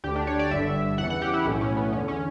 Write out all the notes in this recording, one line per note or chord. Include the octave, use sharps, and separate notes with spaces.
D2 D3 G4
D4
C#5
D5
G1 G2 D3 E5
E2 C#3 E3 F#5
F#5
G4
E4
B1 A2 E3 C#4
C#4
B3
E2 D3 C#4
C#4